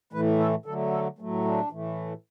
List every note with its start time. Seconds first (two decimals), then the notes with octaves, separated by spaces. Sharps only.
0.13 A2 E3 A3 B4
0.39 A4
0.66 D3 F#3 A3 A4
0.92 A4
1.19 A2 F#3 A3
1.45 D4
1.71 A2 E3 A3